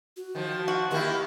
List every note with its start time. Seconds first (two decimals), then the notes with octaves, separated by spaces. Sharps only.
0.17 F#4
0.35 D#3 F3
0.68 F#4
0.91 D#3 A#3 E4 G4